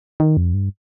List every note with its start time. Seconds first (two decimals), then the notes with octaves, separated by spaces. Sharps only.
0.20 D#3
0.37 F2
0.54 G2